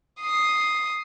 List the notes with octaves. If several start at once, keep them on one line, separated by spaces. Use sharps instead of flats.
D#6 C7